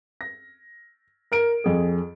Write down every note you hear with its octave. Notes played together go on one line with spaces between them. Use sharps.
A#6
A#4 D7
F2 G#4